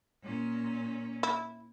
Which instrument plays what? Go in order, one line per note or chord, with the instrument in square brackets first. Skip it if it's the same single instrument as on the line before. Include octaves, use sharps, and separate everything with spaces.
[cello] A#2 C#4
[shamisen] E4